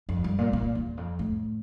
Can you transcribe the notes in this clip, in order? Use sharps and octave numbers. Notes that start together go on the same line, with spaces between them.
F2
G2
A#2
A#2
E2
F2
A2